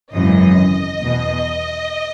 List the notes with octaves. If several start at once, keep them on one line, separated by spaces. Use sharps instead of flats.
G#1 F#2 C#3 E3 D#5
E2 B2